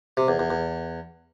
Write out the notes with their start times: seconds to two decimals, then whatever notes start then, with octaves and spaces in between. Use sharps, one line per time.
0.17 C3
0.28 E2
0.39 E2
0.50 E2